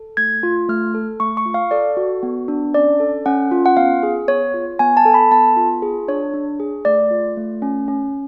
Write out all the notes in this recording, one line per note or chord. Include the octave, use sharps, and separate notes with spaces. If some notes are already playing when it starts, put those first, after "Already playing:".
Already playing: A4
A3 G#6
F4
A3 F6
A4
A3 C#6
C#6
F4
F5
A4 D5
F#4
B3
D4
C#4 D5
A4
C#4 F#5
F4
F#5
B3 F5
G#4
B3 C#5
F4
B3 G#5
A5
A4
B5
B3 A5
F4
G#4
D4 C#5
D4
G#4
A3 D5
F4
A3
C#4
C#4